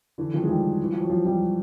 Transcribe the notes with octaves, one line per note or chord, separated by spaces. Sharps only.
D3 E3
D#3 F3
G#3
F3 G3
E3
F3
F#3
F3 G3
F3 G3